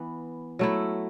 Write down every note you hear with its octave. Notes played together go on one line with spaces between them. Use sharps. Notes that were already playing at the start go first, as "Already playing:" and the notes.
Already playing: E3 B3
F#3 A3 E4